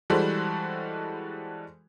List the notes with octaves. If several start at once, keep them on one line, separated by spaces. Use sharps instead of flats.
E3 G3 G#3 F#4 A4 C5